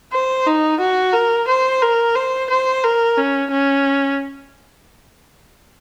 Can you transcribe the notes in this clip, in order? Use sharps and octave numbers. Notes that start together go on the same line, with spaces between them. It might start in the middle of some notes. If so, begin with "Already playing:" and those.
C5
D#4
F#4
A#4
C5
A#4
C5
C5
A#4
C#4
C#4